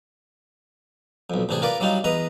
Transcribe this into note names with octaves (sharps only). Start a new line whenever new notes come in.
B1 F2
A1 C3 D4 G#4
F4 A#4 B4 D5
F#3 G3 D4 D#4 F4
E2 B4 D#5 A#5